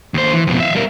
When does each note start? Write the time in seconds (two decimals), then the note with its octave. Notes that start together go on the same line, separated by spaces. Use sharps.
0.14 D#2 C5
0.33 E3
0.47 F2 B2
0.60 E5 F5
0.75 G3 A#4